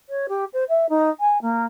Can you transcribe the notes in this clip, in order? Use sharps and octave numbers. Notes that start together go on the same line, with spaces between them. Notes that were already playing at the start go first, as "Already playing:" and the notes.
C#5
G4
C5
E5
D#4
G#5
A#3